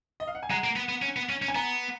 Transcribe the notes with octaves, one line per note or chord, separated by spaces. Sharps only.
D#5
F5
F#5
G#5
G#3 F#5 A#5
A#3
B3
B3
C#4
B3
C#4
C#4
G#5
B3 F#5 A#5